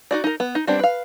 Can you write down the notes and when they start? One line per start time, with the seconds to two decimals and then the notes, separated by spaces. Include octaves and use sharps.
0.11 D#4 F#4 D5
0.24 D#4 A#4
0.40 B3
0.55 D#4
0.67 G3 B3 C4 D4
0.79 B4 F5